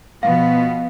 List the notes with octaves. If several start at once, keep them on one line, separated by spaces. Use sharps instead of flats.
B2 F3 B3 F5